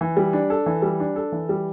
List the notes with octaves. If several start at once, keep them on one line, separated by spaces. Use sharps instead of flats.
E3
G3
D4
A4
E3
G3
D4
A4
E3
G3